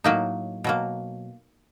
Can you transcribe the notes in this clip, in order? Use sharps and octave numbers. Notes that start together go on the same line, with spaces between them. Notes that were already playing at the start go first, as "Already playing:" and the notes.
A2 F#3 A#3 D#4
B2 F#3 A#3